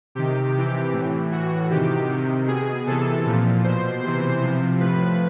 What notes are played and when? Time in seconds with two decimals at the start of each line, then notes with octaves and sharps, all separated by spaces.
0.15 C3 D#3 G4
0.54 C3 E3 G4
0.93 A2 E3
1.32 A2 E3 F#4
1.70 C3 D#3 G4
2.09 C3 D#3
2.48 B2 G#4
2.87 C3 E3 A4
3.25 A#2 F3
3.64 B2 C5
4.03 C3 E3 C5
4.42 C3 F3
4.80 A2 F3 B4